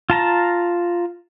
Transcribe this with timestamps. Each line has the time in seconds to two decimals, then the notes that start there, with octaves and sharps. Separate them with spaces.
0.10 F4 A5 A#5